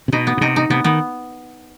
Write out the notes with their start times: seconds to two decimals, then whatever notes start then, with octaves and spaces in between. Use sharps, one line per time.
0.08 C3
0.13 B2 D#4
0.27 B3
0.37 B2
0.41 C3 D#4
0.56 D#4
0.70 C3 B3
0.84 D#3 B3